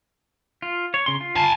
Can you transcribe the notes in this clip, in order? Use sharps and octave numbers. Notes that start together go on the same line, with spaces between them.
F4
C#5
C#3 C6
F4
G#5 A5